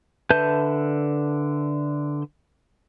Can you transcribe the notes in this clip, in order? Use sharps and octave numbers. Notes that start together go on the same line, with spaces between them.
D3 B4 E5 A5 G6